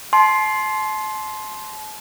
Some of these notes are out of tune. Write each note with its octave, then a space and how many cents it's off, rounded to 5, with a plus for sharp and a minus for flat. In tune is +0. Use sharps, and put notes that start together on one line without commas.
A5 -40 C6 +5